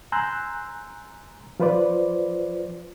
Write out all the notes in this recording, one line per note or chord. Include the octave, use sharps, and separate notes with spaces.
G#5 A#5 C6 E6 F#6 G6
F3 F4 B4 C5 D5